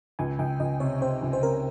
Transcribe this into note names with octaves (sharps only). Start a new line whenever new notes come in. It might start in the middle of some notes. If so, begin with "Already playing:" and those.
C#2 G#5
C#2 G5
C#2 D#5
C3 C#5
C3 C5
C#2
C5
C3 A#4